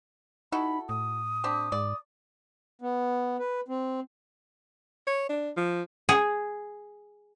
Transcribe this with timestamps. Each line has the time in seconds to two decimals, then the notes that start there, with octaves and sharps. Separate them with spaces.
0.52 D#4 E4 F#4 A4 B5
0.89 A2 D#6
1.44 C4 D4 G4
1.72 G#2 D5
2.82 B3
3.39 B4
3.68 C4
5.07 C#5
5.29 D4
5.57 F3
6.09 G#4